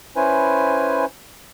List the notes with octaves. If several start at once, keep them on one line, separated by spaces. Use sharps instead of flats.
C#4 E4 B4 C5 G#5